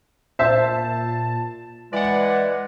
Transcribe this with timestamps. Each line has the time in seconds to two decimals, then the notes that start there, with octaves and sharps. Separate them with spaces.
0.39 A#2 C5 E5 A5
1.92 E3 G#3 D5 F#5